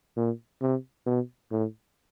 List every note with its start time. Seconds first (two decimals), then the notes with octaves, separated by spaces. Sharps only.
0.17 A#2
0.61 C3
1.06 B2
1.51 A2